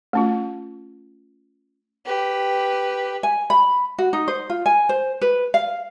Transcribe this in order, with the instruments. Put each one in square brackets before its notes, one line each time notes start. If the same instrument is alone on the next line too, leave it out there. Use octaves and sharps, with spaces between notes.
[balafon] A3 C#4 F4
[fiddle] G4 B4
[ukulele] G#5
B5
F#4
D#4
C5
F4
G#5
C5
B4
F5